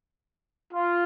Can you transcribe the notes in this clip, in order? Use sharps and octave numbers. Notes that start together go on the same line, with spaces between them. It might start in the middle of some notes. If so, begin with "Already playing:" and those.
F4